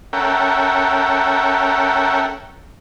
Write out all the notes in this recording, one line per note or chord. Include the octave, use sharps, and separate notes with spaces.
C#4 A4 A#4 E5 F#5 G5